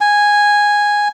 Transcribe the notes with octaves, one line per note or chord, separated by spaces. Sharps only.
G#5